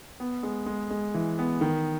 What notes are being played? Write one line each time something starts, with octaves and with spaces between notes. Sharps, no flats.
B3
G#3
G#3
G#3
E3
B3
D#3